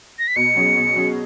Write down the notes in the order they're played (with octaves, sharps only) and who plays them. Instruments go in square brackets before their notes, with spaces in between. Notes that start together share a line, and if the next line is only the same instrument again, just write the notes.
[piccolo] A#6
B6
[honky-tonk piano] B2 [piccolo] C#7
[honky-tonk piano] F#3 C#4 G#4
B2
F#3 C#4 G#4